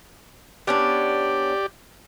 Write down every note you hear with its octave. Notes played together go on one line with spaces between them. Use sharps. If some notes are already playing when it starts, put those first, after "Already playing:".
B3 C#4 D4 G4 D5